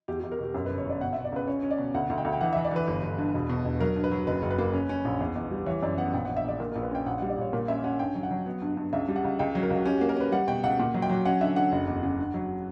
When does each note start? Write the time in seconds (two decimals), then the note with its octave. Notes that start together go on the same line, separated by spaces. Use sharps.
0.08 E2 G4
0.20 E2 G4
0.32 A#4
0.39 B2 G4
0.54 F#2 A#4
0.66 G1 B4
0.78 C#5
0.86 G1 D5
1.01 B2 F#5
1.13 B2 E5
1.24 D5
1.32 C#2 B4
1.47 C#4 C#5
1.63 C#4
1.71 D5
1.79 B2
1.94 D2 F#5
2.10 D2
2.18 G5
2.25 D2
2.33 G5
2.41 E3 F#5
2.53 E3 E5
2.65 D5
2.71 E3 B4
2.88 G1
3.03 G1
3.18 G2
3.34 E1
3.50 B2
3.65 E1
3.80 F#3 A#4
3.96 G2
4.04 B4
4.11 F#3
4.27 F#1 B4
4.42 F#1
4.51 B4
4.58 A#3
4.73 C#4
4.89 C#4
5.05 A#1
5.21 E2
5.36 E2
5.51 G3
5.66 E3 C#5
5.82 F#2 D5
5.98 B3 F#5
6.13 A#1 G5
6.25 A#1 F#5
6.37 E5
6.44 A#1 D5
6.60 A#2 A#4
6.72 A#1 A#4
6.83 B4
6.91 C#4 G5
7.06 A#1 F#5
7.18 G3 F#5
7.30 D5
7.38 A#1 C#5
7.53 A#2 A#4
7.68 C#4 E5
7.84 C#4 F#5
7.99 G2 G5
8.15 F#3
8.23 F#5
8.31 F#3
8.46 B3
8.62 G2
8.77 G2
8.93 C#2 E5
9.09 G3
9.16 F#5
9.24 C#2
9.39 C#2 G5
9.55 F#3
9.63 A#4
9.70 C#2 F#4
9.85 C#4 G4
9.97 A#3 F#4
10.09 A#4
10.17 C#4 B4
10.32 G3 F#5
10.48 B2 G5
10.63 C#2 F#5
10.79 A#2 F#5
10.94 F#3
11.02 G5
11.09 F#3
11.25 C#4 F#5
11.41 D3 E5
11.56 D3 F#5
11.72 F#1
11.88 E2
12.03 C#3
12.19 G2
12.34 F#3